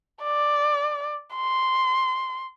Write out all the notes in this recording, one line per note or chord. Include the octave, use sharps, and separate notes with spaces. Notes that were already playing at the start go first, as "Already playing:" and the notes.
D5
C6